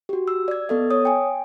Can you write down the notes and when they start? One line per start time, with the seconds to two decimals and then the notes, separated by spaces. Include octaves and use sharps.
0.09 F#4 G4
0.28 E6
0.48 D5 G#6
0.69 B3 A4 D#5
0.91 C#5 D#6
1.05 G5 G#5